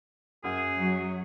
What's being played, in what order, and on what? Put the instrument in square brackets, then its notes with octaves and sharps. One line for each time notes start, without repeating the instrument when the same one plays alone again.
[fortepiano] F#2 [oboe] G#4
[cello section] F#3